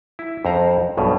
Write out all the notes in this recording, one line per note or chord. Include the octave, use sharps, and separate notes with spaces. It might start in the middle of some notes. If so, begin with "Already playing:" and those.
E4
F2 C5 A#5
B1 G2 B2